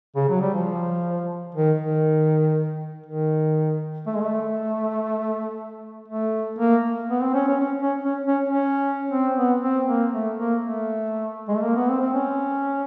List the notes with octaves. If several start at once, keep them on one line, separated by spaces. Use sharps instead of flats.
C#3
F#3
G3
F3
D#3
D#3
D#3
A3
G#3
A3
A3
A#3
B3
C4
C#4
C#4
C#4
C#4
C#4
C#4
C#4
C4
B3
C4
A#3
A3
A#3
A3
G#3
A3
A#3
B3
C4
C4
C#4